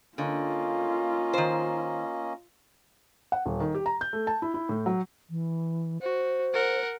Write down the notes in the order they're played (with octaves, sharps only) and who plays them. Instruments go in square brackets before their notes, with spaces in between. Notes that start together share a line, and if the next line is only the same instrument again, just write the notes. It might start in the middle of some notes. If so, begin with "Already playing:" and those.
[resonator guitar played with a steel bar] D3 [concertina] A#3 C#4 D#5 [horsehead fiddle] F4
[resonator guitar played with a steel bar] D#3 C5
[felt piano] F#5
D#1
D#3
G4
A#5
G6
A3
A5
E4
E4
A2
F#3
[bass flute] E3
[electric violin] F#4 [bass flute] C5
[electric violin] A#4 F#5